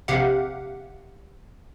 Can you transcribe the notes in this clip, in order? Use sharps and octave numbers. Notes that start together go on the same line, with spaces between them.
A#1 C3 G4 F5 F#5